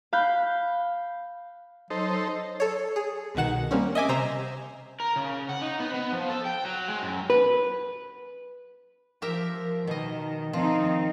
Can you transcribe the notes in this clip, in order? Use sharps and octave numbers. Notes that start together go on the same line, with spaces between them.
F5 B5 F#6 G6
F#3 D#4 A4 C5
A4 C#5
G#4
C2 B2 D#3 F#5 E7
G3 A#3 C4 C#4
D#5 E5 G#5 D6
C3 C5 A#5 E6
A#4
C#3
F#5
D#4
B3
B3
F3
A4
G5
F#3
G#3
F#2
B4
F3 G4 A#4 E5
B2 D#3 D#5
D#3 F3 C4 D#4